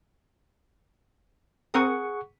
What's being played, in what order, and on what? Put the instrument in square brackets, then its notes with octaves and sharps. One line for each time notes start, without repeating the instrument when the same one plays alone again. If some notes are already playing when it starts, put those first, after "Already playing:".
[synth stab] C4 A#4 D#6 [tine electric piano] G#4 F#5 C#6